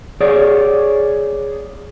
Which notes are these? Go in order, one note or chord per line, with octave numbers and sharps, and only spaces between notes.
G#4 C#5 D5